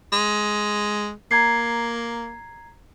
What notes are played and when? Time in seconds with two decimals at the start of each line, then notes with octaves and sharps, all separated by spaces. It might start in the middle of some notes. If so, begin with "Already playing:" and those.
0.12 G#3
1.31 A#3 A#5 G#6 C7